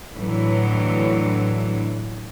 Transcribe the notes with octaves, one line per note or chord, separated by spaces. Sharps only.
A2 D3 E3 F#3